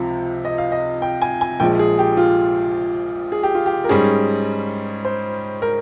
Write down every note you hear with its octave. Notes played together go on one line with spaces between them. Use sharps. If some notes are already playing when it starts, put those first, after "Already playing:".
Already playing: C#2 C3 F3
D#5
F5
D#5
G5
G#5
G#5
A#1 A#2 F3 G#3 G5
G#4
G4
F4
G#4
G4
F4
G4
A#4
G#2 G3 C#4 G#4
C5
A#4